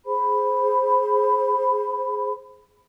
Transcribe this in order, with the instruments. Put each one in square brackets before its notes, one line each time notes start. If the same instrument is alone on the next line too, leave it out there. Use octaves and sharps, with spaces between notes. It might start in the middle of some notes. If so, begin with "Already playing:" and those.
[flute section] G#4 C5 B5